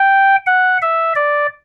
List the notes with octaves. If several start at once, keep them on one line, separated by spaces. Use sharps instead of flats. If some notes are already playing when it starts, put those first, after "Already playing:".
Already playing: G5
F#5
E5
D5